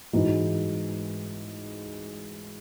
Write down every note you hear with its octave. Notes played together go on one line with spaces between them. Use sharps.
G#2 E3 G#3 D#4 F#4